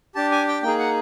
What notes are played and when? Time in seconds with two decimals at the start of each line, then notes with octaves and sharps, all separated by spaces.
0.15 D4 G4 A5
0.31 G#5
0.48 G5
0.63 A#3 D#4 G#4 G5
0.79 F#5